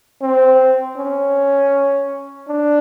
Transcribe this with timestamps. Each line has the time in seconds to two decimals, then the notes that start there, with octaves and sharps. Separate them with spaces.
0.21 C4
0.97 C#4
2.49 D4